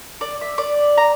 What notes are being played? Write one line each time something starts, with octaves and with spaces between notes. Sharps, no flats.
D5
E5
D5
A#5